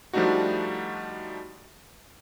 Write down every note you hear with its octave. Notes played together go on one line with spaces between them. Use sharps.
F3 G3 A3 D4 D#4 F#4